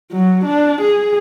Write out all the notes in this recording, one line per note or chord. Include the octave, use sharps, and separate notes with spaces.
F#3
D4
G#4